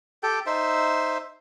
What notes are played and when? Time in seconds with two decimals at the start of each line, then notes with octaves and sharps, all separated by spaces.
0.23 G4 A4 G5
0.46 D#4 C5 E5